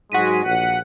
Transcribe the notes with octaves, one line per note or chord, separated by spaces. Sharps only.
G#2 F#3 G#3 F#4 B6 D#7
A#1 F#5